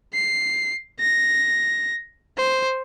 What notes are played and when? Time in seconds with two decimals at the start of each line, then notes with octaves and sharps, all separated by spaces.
0.14 C7
1.00 A#6
2.37 C5